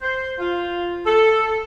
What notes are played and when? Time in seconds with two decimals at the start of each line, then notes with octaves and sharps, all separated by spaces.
0.02 C5
0.39 F4
1.06 A4